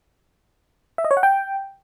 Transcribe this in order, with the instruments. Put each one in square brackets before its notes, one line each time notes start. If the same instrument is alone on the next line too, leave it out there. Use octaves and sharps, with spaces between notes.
[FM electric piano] E5
D#5
C#5
F#5
G5